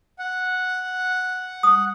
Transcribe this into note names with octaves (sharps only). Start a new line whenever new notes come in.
F#5
D#6